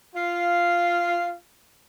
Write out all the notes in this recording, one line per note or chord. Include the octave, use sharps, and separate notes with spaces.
F4 F5